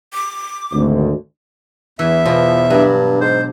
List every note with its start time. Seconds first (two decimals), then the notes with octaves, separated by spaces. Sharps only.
0.14 D6
0.73 G#1 D2
1.99 E2 E3 E5
2.25 B2 F3
2.70 G2 F#3 D4
3.21 G#2 C5